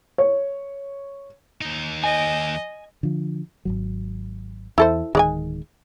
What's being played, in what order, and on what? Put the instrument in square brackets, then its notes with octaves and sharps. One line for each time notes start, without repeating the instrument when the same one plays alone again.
[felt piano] C#5
[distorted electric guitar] D#2 D#4
[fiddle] D#5 [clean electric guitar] G#5
[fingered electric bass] D3 F3
G#1 C#2 F#3
[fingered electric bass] E2 [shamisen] E4 A4 C5
[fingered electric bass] D1 D#3 [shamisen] G#3 D5 G#5